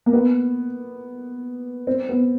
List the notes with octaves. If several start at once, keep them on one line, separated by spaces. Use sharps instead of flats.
A#3
B3
C4
B3